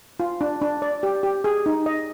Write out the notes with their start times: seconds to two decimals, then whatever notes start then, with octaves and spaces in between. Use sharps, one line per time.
0.20 F4
0.41 D4
0.62 D4
0.82 D5
1.03 G4
1.23 G4
1.44 G#4
1.66 D#4
1.86 D#5